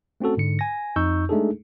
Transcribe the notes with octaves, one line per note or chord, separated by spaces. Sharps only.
A3 C4 C#4 F#4 A4
G#2 D3 C#7
G#5 A#6
F2 D#4 C#6 E6 G6
G#3 A3 D4 D#4 G#4 A4